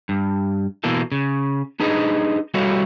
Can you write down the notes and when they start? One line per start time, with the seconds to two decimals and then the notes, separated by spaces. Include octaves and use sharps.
0.09 G2
0.84 B2 E3 A#3 A4
1.12 C#3
1.80 D4 D#4 G#4 B4 D#5
2.54 G3 E4 F#4 A4 C#5 F5